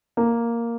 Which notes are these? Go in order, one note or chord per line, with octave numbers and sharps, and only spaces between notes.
A#3